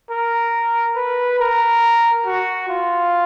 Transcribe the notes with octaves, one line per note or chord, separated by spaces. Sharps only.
A#4
B4
A#4
F#4
F4